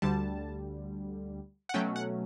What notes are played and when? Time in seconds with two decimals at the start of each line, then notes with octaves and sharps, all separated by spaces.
0.02 D2 D3 G3 A5
1.69 F#5
1.74 B2 F#3 A3 C#4 G5
1.96 F#5